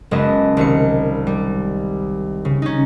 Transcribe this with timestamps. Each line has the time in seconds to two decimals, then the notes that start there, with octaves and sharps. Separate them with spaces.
0.11 F#1 G#3 B3 D#5 A5
0.57 C2 D#3 C#7
1.27 G3
2.45 C#3
2.62 C#4 D#4